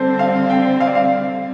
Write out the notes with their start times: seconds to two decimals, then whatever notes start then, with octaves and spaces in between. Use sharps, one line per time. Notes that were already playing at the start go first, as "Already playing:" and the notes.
Already playing: D3 G3 C4 A4 C5
0.19 F5
0.50 G5
0.80 F5
0.87 D5
0.95 F5